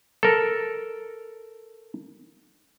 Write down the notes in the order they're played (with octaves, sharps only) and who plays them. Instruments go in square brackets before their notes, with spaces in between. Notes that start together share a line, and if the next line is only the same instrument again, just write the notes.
[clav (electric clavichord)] A4 A#4